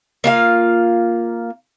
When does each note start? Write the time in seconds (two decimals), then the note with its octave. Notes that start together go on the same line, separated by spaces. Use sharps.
0.24 A#3 F4 F5